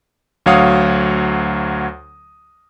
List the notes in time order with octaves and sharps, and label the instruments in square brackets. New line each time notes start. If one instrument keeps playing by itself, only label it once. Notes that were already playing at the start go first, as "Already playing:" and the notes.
[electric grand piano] D2 F#3 C#5 F5 F#5 D#6